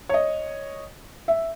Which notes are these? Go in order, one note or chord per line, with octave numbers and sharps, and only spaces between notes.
C#5 D#5
E5